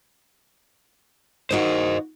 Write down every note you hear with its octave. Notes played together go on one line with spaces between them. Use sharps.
D#3 A#3 F#4 C5 D#5